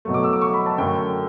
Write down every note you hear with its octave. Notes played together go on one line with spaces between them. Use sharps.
B2 F#3 A3
D6
E6
D6
C#6
B5
A5
F#2 D3 A3 G5